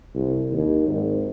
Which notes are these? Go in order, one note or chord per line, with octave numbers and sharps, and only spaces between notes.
C2
D#2
G#1